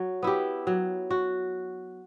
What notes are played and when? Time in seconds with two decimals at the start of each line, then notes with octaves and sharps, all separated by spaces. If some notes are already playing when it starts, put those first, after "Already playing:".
Already playing: F#3
0.23 B3 E4 G4
0.67 F#3
1.11 F#4